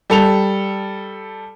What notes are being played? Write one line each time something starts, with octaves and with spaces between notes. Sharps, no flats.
G3 A4 F7